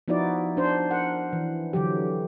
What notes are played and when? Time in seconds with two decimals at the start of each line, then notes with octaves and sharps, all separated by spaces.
0.08 F3 B3 D#4 E4 F#4 D5
0.57 D4 C5
0.91 A#4 F#5
1.33 E3
1.73 D3 E3 F#3 G4